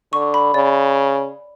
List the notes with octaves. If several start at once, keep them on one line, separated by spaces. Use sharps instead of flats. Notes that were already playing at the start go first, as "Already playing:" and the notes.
D3 C#6
B5
C#3 D5